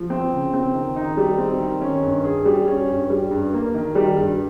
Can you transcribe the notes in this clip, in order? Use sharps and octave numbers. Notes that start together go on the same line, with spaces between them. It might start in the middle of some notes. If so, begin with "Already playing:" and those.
Already playing: F3
C4
C#3
C4
D#3
D#4
G3
C4
D#3
C#4
G2
G#4
G3
C#4
G2
G3
G2
A#3
D#3
G3
G2